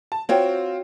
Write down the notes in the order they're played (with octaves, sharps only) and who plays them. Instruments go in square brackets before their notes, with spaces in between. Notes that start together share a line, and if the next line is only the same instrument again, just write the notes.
[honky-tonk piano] A5
[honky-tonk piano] C4 F4 [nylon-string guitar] F#4 C#5 G5